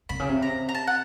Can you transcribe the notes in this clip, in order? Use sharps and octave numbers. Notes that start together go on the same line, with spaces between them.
C3 B5
C#3
C3
A#5
A#5
A5
F#5